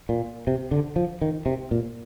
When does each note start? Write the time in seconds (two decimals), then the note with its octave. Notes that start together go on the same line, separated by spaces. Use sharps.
0.09 A#2
0.47 C3
0.71 D3
0.96 F3
1.22 D#3
1.46 C3
1.71 A#2